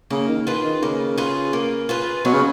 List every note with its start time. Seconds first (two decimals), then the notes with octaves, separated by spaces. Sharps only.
0.10 C#3 A#3
0.28 D#3
0.46 D#3 F4 G#4 B4
0.64 D#3
0.82 C#3 A#3
1.18 F4 G#4 B4
1.53 A#3
1.89 F4 G#4 B4
2.25 B2 F#3
2.33 C#3